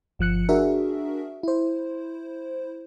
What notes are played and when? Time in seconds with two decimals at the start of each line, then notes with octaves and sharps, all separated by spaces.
0.19 G1 F3 F#6 C#7
0.49 D4 F#4 G#4 A#4 E5
1.43 E4 C5